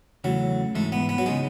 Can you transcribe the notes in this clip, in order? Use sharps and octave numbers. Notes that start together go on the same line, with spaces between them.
E2 C#3 E3 F#3 A3
G#2 E3 G#3 A3
B3
B3
F#3
C#3 E3 G#3 B3 D#4